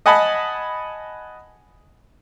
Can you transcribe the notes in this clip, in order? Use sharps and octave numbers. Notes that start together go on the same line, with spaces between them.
D#5 F#5 G#5 A5 B5 D#6